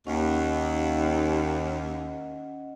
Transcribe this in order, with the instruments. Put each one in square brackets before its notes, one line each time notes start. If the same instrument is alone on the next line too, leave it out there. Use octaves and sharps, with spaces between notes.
[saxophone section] D#2 [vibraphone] C#4 D#5 F#5